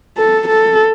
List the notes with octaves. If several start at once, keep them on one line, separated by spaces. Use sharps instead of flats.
A4
A4